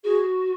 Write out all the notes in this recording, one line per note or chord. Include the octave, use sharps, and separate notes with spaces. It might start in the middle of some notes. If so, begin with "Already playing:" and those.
F#4 G#4